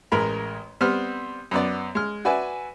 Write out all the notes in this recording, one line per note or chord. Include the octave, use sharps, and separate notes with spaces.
A1 G#3 A#4 A#5 B5
G3 B3 C4 F6
F#2 B3 D5
G#3 F6
F#4 B4 D5 E5 G#5